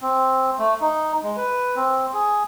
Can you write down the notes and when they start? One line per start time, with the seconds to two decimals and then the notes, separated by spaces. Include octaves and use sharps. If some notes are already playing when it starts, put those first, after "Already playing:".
0.01 C4
0.59 A3
0.81 D#4
1.23 G#3
1.37 B4
1.76 C4
2.14 G#4